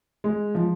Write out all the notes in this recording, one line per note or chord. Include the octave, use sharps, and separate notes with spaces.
G#3
F3